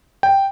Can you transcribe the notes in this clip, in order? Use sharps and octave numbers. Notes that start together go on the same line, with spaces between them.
G5